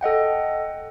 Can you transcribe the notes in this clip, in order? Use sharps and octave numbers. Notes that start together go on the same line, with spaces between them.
A4 D#5 F#5 G5